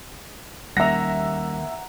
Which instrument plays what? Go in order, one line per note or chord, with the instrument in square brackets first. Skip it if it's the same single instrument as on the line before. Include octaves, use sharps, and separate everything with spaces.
[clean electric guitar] D#2 A#3 [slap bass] G3 C#4 [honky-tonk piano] E5 A#6 [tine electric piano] F#5 A#5